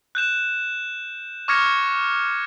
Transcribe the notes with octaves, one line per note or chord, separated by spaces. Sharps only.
F#6 G6 E7
C#6 D6 F6 G#6 A#6 C#7